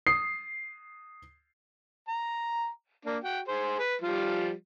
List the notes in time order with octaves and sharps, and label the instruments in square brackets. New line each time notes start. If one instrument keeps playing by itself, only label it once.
[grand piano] D#6 C7
[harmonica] A#5
A#3 D4
F#4 G5
G#4 C5
B4
F3 G3 F4